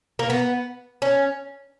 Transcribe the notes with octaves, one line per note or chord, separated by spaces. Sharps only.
A#3
B3
C#4